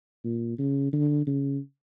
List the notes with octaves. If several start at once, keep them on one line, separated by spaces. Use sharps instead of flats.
A#2
C#3
D3
C#3